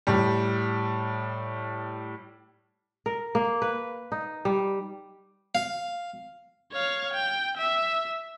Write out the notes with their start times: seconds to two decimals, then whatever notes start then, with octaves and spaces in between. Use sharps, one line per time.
0.07 A2 G3
3.06 A#4
3.35 A#3
3.62 B4
4.12 D#4
4.45 G3
5.55 F5
6.72 C#5 F5
7.13 G5
7.57 E5